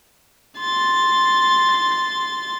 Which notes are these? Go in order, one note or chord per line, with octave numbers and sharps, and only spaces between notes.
C6 A6